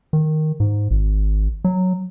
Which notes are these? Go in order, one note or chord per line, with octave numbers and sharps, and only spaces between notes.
D#3
G#2
G#1
F#3